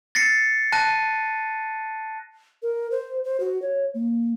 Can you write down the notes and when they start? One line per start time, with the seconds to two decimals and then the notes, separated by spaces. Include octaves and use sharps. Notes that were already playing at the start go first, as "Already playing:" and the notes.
0.15 A6 A#6 C7 C#7
0.72 A5 F#6 A#6 D#7
2.62 A#4
2.91 C5
3.24 C5
3.40 F#4
3.62 C#5
3.94 A#3